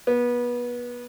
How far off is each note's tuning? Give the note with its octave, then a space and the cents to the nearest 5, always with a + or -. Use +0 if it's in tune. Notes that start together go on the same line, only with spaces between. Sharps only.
B3 -25